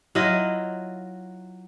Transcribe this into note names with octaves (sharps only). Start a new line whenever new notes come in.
F#3 E4 F4 D#5